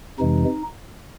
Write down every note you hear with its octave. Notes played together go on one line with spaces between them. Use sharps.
F2 C3 E3 G#3 D#4